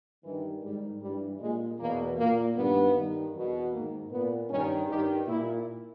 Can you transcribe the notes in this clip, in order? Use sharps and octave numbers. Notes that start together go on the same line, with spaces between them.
G2 D#3 E3
G#2 D#3 G3
G2 E3 G3
A#2 G#3
E2 B2 A#3
A#2 A#3
G2 D#3 B3
G2 D#3
E2 B2
G#2 D#3 A#3
A#2 B3
G2 D#3 C#4
G2 D#3 G4
A#2 E4